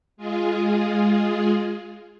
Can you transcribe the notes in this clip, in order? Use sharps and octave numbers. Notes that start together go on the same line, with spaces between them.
G#3 F4 G#4